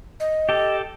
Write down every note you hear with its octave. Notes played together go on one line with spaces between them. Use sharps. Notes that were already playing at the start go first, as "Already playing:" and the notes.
D#5
G4 A4